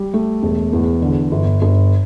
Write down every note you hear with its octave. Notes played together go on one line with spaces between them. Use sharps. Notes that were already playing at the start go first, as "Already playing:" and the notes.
Already playing: G3
A3
E1
E2
D3
G1
G1